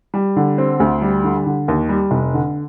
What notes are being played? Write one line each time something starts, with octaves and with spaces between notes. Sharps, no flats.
G3
D3
C4
D2
G3
D3
D3
D#2
G3
F1
D3